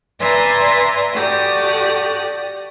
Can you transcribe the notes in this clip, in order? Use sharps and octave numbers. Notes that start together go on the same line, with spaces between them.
B4 D5 E5 G#5 A#5 C6
F#4 G4 A4 D5 D#6